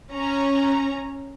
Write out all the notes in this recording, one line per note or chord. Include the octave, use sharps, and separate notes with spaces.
C#4 A#5